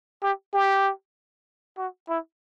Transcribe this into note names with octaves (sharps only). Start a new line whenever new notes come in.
G4
G4
F#4
E4